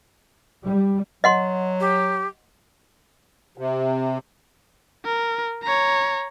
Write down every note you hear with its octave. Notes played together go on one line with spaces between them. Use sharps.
G3
F#3 D#5 F#5 C6
G4
C3
A#4
C#5 A#5